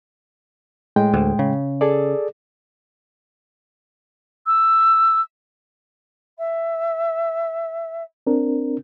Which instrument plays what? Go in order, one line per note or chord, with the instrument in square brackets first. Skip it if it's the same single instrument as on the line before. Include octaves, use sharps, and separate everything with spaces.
[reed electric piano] A2 G#3 G5
[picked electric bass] D2
C#3
[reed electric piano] G#4 A4 D5
[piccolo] E6
[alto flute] E5
[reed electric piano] C4 D4 A#4